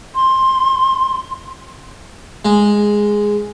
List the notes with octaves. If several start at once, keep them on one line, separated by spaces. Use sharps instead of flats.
C6
G#3